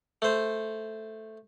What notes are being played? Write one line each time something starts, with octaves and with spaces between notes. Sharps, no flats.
A3 C5